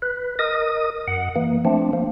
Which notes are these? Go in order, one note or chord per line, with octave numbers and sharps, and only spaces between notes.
B4
A#4 D#5 D#6
F#2 F#5
E3 A#3
F3 A3 C4 D4
F3 A#3